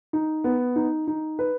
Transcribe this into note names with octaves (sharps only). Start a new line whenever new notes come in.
D#4
B3
D#4
D#4
B4